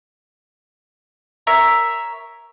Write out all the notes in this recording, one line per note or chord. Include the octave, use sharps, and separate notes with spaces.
A#4 C#5 E5